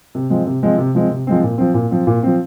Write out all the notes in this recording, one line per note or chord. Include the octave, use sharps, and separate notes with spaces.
C3
F3 G#3 C4
C3
F3 G#3 C4
C3
F3 G#3 C4
C3
F3 G#3 C4
A#2
F3 C4
A#2
F3 C4
A#2
F3 C4